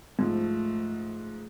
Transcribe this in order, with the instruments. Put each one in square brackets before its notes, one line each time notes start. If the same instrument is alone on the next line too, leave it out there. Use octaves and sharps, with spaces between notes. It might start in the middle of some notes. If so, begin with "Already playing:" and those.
[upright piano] G#2 F3 [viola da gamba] A3